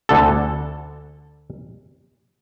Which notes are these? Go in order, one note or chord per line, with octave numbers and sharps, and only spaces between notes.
D2 D3 A4